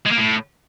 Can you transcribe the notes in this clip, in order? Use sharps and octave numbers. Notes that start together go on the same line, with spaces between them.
G#3
A#3
A2